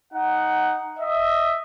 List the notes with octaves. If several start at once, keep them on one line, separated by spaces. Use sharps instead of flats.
D#4 F#5
D#5 E5